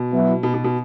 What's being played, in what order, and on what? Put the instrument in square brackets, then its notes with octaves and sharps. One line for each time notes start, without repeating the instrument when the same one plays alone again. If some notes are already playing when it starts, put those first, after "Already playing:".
Already playing: [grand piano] B2
[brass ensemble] F#3 B3 E4
[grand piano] B2
B2
B2